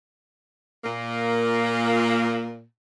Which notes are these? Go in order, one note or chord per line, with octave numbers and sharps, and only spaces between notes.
A#2 A#3